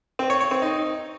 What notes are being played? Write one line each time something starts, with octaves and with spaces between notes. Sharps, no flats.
C4
C#5
C#5
C4
D#4